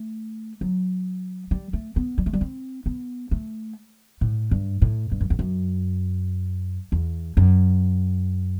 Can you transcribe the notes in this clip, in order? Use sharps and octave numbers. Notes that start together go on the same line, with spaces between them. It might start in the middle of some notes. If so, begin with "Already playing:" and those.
Already playing: A3
F#3
G3
A3
B3
G3
A3
G3
C4
B3
A3
A2
G2
A2
G2
F#2
E2
F#2
E2
F#2